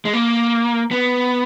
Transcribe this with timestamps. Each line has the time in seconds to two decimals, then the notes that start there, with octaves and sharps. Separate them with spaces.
0.05 G#3
0.13 A#3
0.91 B3